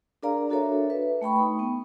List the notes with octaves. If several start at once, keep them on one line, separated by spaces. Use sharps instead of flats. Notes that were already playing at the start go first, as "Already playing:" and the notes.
D4 G#4 A#4 D5 F5 A#5
D4 F#4 A4 A#4 C#5 E5
B4 E5
A3 G5 B5 C#6
D#4
B3